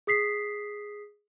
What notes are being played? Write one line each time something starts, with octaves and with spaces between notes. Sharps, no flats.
G#4 D#6 B6 C7